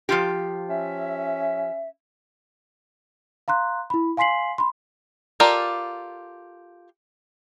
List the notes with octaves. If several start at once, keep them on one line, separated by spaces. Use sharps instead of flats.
F3 F4 G4
C#4 E5
F5 A#5 C6 F#6
E4 B5
F5 G#5 C6 B6 C7 F#7
B5 C6
F4 G4 A4 A#4 D5